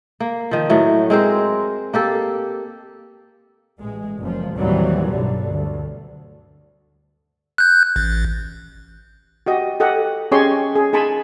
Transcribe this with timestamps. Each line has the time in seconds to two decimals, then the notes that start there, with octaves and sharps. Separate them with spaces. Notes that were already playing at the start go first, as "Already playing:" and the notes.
0.20 A#3
0.51 D#3 F3
0.70 A2 F#3 A3
1.10 G#3 C4 A#4 C5
1.94 A#3 G4 A4
3.80 A1 G#3
4.21 F#1 F3
4.58 D#2 A2 E3 F#3 G3 C4
5.11 B1 G2 D3
5.53 D2
7.58 F#6 G6
7.96 A1
9.46 F#4 G4 D#5
9.80 G4 A4 D#5 F#5
10.32 C#4 G4 G#4 C#5 D#5 C6
10.75 G#4
10.93 D#4 G#4 G#5 A5 B5 C6